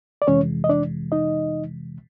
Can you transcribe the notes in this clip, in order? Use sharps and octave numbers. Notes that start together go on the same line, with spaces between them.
D5
F2 C3 E3 G#3 C#4 C#5
D#5
D4 D5
D#4 D#5